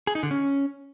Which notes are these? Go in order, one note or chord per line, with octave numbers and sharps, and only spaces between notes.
G#4
D#4
D3
C#4